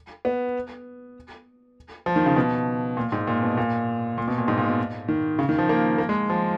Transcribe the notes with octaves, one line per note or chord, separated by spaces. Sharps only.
B3
F3
D#3
C#3
B2
A#2
G#2
A#2
B2
A#2
A#2
B2
A#2
G#2
A#2
B2
D#3
C#3
D#3
F3
A#3
A#3
G#3
F3